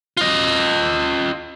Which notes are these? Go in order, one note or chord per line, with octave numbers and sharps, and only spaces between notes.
F4 D#5